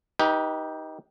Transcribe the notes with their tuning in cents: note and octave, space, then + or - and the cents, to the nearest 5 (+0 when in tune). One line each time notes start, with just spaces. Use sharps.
D#4 +15 G4 +0 B4 -30